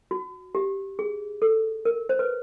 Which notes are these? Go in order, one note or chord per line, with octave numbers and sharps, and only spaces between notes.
F#4
G4
G#4
A4
A#4
C5
B4